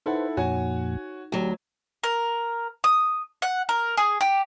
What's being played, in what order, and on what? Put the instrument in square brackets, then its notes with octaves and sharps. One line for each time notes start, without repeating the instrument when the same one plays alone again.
[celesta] D#4 [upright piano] E4 A4 F#5 [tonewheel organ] B4 C5
[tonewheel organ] F2 A#2 [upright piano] F#4 C#5 G#5
[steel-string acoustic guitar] D2 F#3 [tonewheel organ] G4
[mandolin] A#4
D#6
F#5
A#4
G#4
G4